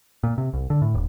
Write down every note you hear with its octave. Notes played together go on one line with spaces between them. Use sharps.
A#2
C3
C2
D3
A2
D#1